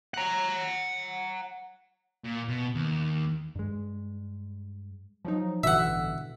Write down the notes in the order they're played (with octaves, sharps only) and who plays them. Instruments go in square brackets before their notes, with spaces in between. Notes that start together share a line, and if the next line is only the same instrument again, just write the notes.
[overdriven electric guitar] F#5 A#5
[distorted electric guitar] A#2
B2
D#2
[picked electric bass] G2 G#3
[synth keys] F3 F#3 D#4
[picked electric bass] A1 G2 E3 [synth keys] B2 D3 [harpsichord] E5 F#5